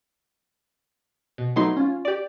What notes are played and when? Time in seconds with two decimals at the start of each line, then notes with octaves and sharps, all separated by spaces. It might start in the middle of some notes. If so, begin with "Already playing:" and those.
1.38 B2
1.56 F#3 A3 B3 D#4 E4 C6
1.77 C#4 F4
2.05 G4 D5